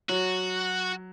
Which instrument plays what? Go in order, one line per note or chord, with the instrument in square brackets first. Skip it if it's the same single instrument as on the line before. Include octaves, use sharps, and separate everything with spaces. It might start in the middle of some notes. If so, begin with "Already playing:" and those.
[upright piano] F#3 [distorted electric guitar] F#4